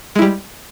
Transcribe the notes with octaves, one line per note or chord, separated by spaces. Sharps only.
G3 G#3 E4